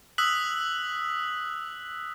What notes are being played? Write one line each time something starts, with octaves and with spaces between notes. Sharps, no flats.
D#6 E6 F#6 B6 F#7